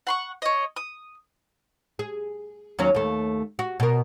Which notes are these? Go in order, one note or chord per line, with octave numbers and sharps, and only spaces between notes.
F#5 C6 C#6
C#5 D#5
D#6
G#4
D#2 F#3 C#4
D#2 A3
F#4
B2 A#4